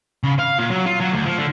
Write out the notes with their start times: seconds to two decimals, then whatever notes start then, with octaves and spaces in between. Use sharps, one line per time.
0.23 C#3
0.39 F5
0.59 A#2
0.70 F#3
0.86 F4
1.01 F#3
1.13 D2
1.26 F3
1.38 D3